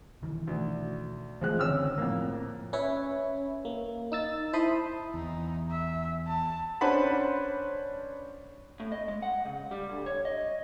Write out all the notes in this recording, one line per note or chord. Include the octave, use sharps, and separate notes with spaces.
B1 D#3 E3
D2
E3 F3 G#3 A3 F#6
F#1 D3 D#3 C#4 E6 F6
F2 A2 A#3
C#4 B4 C#5 E5
A#3
D#4 E6 A6
E4 C5 A5 B5 C6 D#6
E2 D#4
E5
A5
C#4 D4 B4 C5 F#5 B5
A2
D#5
G#3
F#5
C#3
G3
D2
C#5
D#5